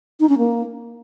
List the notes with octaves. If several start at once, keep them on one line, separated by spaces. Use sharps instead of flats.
D#4
C#4
A#3